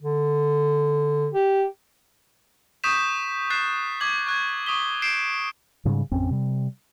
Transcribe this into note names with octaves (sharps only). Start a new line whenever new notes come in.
D3
G4
C#6 D#6 G6 B6 E7
F#6 A6 C7 E7
D6 G#6 F#7
C#6 F#6 G#6
C#6 D#6 B6 G7
G6 C7 D7 E7
G#2 C#3 G3
A1 F2 C4 C#4
C3 G3